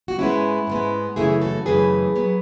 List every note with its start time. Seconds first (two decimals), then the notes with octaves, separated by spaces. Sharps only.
0.08 F#4
0.18 G#2 G#3 B3 C#4 E4
0.67 G#2 G#3 B3
1.16 F#2 C#3 E3 A3 E4 G#4
1.41 F#4 A4
1.66 F#2 C#3 E3 A3 G#4 B4
2.16 F#3 B3